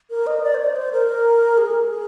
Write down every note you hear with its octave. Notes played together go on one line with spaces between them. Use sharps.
A#4
D#5
D5
C5
D5
C5
A#4
G#4
A#4
G#4